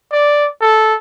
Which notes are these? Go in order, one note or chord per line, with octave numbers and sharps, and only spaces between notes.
D5
A4